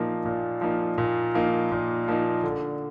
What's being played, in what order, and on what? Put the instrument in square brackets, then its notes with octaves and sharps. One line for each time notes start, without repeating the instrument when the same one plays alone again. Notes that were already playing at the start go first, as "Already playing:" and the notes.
Already playing: [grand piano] A#2 F3 A#3 D#4
A#2
F3 A#3 D#4
A#2
F3 A#3 D#4
A#2
F3 A#3 D#4
D3